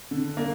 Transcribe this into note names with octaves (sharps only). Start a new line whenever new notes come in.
D3
A#3